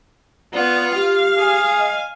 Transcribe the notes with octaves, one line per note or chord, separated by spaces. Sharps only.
B3 F4 D5
G4 F5
G#4 G#5
D#5